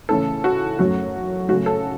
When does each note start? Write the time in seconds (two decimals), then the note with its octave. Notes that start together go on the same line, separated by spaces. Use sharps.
0.09 C#3 E3 A3 C#4 E4 A4
0.44 F#4
0.79 F#2 F#3 A3 C#4 F#4
1.48 C#3 F#3 A3 F#4
1.66 A4